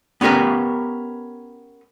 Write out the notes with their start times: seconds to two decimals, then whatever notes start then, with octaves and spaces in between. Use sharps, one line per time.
0.21 B3 C#4 G4 A#4 B4